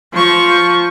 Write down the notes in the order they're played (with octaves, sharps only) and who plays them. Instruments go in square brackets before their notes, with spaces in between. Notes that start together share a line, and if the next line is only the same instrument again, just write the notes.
[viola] F3 C#6